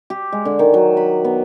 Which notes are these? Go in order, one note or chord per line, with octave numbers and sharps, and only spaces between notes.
G4
G#3
D3
D#3
F#3
B5
B3